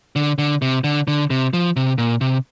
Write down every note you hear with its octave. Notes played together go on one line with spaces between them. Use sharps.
D3
D3
C3
D3
D3
C3
F3
C3
A#2
C3